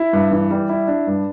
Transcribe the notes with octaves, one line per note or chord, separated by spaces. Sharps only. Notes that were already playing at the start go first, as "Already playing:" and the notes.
Already playing: E4
G2
E3
G3
E4
D4
G2